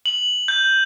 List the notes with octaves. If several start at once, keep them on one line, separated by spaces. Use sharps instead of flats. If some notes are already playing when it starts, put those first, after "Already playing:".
F#7
G6